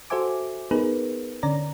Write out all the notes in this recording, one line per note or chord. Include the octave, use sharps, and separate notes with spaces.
F#4 A4 C5 E5 G#5 D6
B3 D#4 G#4 A#4 B4
D3 C#4 D5 A#5